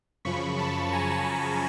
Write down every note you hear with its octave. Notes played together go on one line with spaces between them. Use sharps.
F#2 C#3 F3 B5 C#6
A5 B5
G#5 A#5